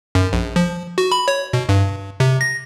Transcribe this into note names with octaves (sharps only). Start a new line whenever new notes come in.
F#2
A#1
F3
F#4
B5
C#5
B2
G2
C3
A#6